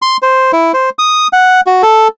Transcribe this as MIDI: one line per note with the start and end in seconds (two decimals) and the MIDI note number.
0.02 0.17 84
0.22 0.51 72
0.53 0.72 64
0.74 0.90 72
0.99 1.27 87
1.33 1.61 78
1.67 1.82 66
1.83 2.08 69